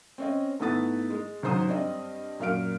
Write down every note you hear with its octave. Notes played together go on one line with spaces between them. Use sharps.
C4 C#4 D#5
G#2 A3 B3 E4 D#6 A6
G#3
C#2 G#2 F#3 C5 A#5 D#6
G2 C4 D5 D#5
F#2 A#2 F5 F6 D7